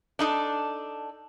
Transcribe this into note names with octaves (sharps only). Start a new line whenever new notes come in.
D4 D#4 A4